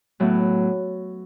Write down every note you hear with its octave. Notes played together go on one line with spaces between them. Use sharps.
A2 F#3 B3